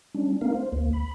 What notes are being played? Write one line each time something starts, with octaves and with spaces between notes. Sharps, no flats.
G3 C#4 D4
A3 B3 C#4 D#4 A#4 F5
C5
D2 A#3
B5